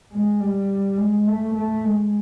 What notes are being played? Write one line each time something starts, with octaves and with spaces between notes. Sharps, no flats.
G#3
G3
G#3
A3
A3
G#3